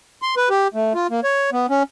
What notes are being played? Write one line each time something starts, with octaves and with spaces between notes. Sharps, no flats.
C6
B4
G4
A3
F4
A#3
C#5
B3
C#4